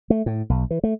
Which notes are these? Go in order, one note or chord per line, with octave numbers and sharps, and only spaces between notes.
A3
A2
B1
E3
A3